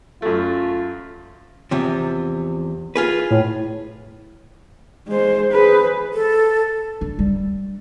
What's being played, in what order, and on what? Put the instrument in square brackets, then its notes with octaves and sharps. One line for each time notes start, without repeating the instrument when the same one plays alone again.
[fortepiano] F#2 A3 [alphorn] F4
[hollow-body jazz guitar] E2 C3 F3
F4 G#4 B4
[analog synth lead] A2
[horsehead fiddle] G#3 C5
[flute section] G#4 C5 [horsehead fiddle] B4
[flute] A4
[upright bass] D4
G3